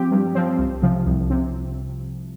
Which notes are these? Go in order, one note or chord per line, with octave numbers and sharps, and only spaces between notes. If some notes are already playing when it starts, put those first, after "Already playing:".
Already playing: F3 C4 G4
G2
F3 C4
C2
C3 F3
C2
C3